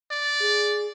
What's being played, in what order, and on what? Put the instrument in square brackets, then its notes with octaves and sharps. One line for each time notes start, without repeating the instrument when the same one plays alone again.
[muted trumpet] D5
[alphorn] G#4